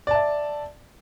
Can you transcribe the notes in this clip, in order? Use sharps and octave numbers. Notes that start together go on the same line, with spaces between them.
D5 E5 A5